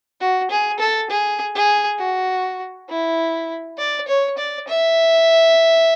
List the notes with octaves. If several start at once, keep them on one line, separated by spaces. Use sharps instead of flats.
F#4
G#4
A4
G#4
G#4
F#4
E4
D5
C#5
D5
E5